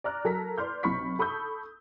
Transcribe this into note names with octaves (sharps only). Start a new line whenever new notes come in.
D5 A#5 F6 F#6
F#3 A4 A#4 A#5 B6
B4 D5 C6 F6 G6
B1 C3 B5 C#6 B6
A4 B5 C#6 D#6 E6 G6